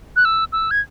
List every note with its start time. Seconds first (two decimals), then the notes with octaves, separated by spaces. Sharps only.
0.16 F#6
0.25 E6
0.53 E6
0.71 G#6